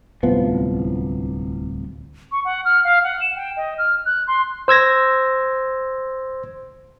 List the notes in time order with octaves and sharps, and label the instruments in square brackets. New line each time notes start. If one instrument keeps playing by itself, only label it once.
[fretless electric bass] D1 C2 F3 B3
[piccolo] C#6
F#5
F6
F5
F#5
E7
G5
D#5
F6
F#6
C6
[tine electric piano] C5 E6 G#6 A#6